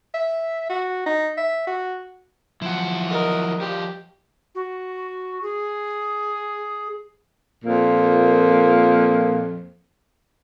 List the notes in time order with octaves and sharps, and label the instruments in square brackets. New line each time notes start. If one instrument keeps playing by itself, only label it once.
[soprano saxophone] E5
F#4
D#4
E5
F#4
[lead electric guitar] F3 F#3 [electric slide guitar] E4 F#5
[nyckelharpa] A#4 D#5
[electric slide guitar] F3 G3 [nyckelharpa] G4
[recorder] F#4
G#4
[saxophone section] F2 A#2 A#3